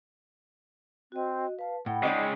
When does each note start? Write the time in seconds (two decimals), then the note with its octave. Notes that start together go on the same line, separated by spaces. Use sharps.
1.12 C4 F#4 D#5
1.59 B4 F5 A5
1.86 A2 F#5 G5 B5
2.03 C#3 G#3 D#4 D5 D#5